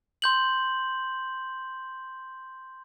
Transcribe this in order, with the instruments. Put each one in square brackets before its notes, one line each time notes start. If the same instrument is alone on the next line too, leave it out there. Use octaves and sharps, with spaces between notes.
[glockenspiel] C6 G6 F#7